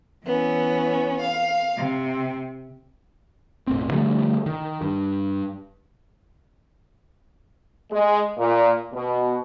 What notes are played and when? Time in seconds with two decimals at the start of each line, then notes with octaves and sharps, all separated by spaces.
0.25 E3 B3 C#4
1.20 F5
1.77 C3
3.67 E1 A1 C4
3.91 D3 F3 G3 A3
4.46 D#3
4.82 G2
7.92 G#3
8.37 A#2
8.93 B2